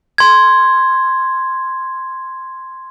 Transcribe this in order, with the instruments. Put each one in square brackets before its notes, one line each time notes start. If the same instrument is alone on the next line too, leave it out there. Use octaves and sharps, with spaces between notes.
[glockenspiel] C6 G#6